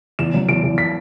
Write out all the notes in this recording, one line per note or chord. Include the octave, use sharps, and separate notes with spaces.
E2 E7
F#3
E2 D7
E2
B6